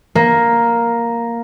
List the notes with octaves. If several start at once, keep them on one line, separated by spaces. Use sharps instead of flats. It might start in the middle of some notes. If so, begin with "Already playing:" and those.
A#3